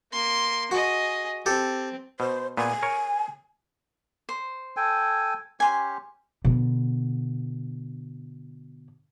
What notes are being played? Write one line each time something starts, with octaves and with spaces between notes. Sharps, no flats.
A#3 C6
F#4 G#4 D#5
C4 G4 A4
B2 C5
A#2 B3 G#5
A#4 C#5
C5
A4 G5 G#5
C#4 G4 G#5 C6
B2 D3